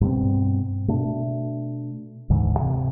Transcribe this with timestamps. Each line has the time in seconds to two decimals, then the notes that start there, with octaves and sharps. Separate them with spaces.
0.01 G2 B2 C4
0.88 B2 A3 D4
2.30 D2 G#2 E3
2.60 C3